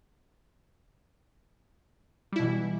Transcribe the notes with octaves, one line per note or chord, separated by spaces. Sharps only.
B2 E3 G3 E4